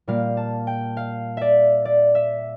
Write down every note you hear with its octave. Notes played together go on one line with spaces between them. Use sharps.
A#2 G3 A#3 F5
A5
G5
F5
D5 E5
D5
E5